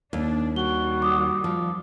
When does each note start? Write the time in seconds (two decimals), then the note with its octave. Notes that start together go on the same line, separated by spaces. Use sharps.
0.13 D#2 D4
0.56 D#3 G3 F#4 G7
1.02 D6 D#6
1.44 F3